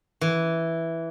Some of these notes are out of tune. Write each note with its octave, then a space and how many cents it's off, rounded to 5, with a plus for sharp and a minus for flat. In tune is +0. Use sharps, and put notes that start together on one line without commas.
E3 +0